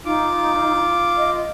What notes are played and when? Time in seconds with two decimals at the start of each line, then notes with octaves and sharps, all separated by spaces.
0.05 D#4 F4 D6
1.18 D#5